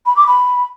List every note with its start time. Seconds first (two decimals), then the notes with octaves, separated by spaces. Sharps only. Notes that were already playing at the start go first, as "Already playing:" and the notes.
0.06 B5
0.16 D6
0.27 B5